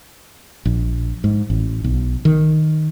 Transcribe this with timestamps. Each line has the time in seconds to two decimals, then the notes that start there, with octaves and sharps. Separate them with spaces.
0.65 A#1
1.24 G#2
1.50 A1
1.84 B1
2.25 D#3